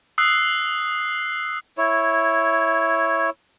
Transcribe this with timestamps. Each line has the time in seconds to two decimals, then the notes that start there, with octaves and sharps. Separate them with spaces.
0.18 D#6 E6 F#6 C7
1.78 E4 C#5